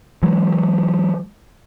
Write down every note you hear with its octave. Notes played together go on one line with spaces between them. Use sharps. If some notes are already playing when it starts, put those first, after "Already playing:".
E3 F#3 G#3